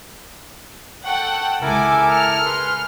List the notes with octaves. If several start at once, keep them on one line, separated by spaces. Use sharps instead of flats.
A4 F#5 G5 C#6 F#6
C#2 E4 A4 A#4 G#5 D6
G#4 F6 C#7
B4 C6